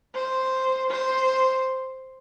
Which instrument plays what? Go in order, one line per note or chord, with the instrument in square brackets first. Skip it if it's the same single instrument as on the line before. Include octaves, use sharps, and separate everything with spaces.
[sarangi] C5
C5